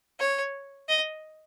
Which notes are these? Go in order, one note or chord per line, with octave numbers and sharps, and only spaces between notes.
C#5
D#5